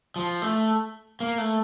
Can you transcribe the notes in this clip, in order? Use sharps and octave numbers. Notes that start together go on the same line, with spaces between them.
F3
A3
A#3
A3